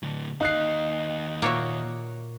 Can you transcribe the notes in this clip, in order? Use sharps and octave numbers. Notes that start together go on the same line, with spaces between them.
A2 D3
D#2 D#4 F5 F#6 C7
A#2 A#3 F#4 C#5 E5